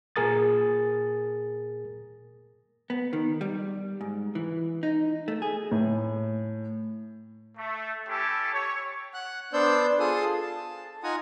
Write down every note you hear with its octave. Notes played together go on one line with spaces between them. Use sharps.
A#2 G#4 A#4 D#6 A6
B3
D#3
G3
G#2
E3
D#4
A3
G#4
A2
A3
C#4 E4 G4 A4
C#5
F#5 F#6
B3 D4 C5 D5 E6 G6
F4 G#4 A4 C6 D#6
A5
D#4 F4 F#5 G#5 A#5 D#6